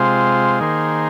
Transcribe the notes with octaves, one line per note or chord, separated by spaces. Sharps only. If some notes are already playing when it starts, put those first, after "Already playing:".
Already playing: C3 G#3 F4 C5
D#3 A#3 G#4 C5